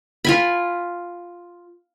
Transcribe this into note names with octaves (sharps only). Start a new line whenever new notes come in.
F4 G#5 B5